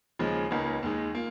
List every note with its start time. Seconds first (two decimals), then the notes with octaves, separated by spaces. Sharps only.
0.19 D#2 C#3 F3 G#3
0.51 C#2 C#3 A#3 D#4
0.83 D#2 D#3 G#3 D#4
1.15 A#3 F4